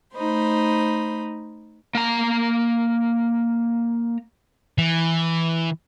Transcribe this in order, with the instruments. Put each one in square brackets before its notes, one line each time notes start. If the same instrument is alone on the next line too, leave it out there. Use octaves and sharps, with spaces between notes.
[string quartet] A3 D#4 C5 B5
[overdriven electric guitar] A#3 A#5
[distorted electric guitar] E3